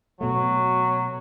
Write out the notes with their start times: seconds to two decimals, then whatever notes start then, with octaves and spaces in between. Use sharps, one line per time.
0.21 B2 F#3 A3